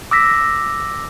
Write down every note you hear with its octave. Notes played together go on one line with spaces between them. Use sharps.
D6 E6 A#6 B6